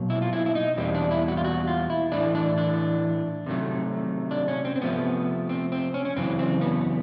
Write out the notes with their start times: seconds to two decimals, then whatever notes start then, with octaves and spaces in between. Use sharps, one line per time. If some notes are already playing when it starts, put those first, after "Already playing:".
Already playing: B2 F#3 A#3
0.10 E4
0.22 F4
0.33 E4
0.46 E4
0.55 D#4
0.77 E2 B2 G3 A#3 C4
0.95 D4
1.11 E4
1.28 F#4
1.37 F4
1.44 F#4
1.67 F4
1.90 E4
2.12 A2 E3 A3 D4
2.35 D4
2.58 D4
3.46 C3 D#3 F#3 A3
4.31 D4
4.48 C#4
4.65 C4
4.76 C4
4.82 C3 F3 A3 B3
5.49 C4
5.72 C4
5.94 C#4
6.05 C#4
6.17 F#2 C#3 E3 C4
6.39 C4
6.61 B3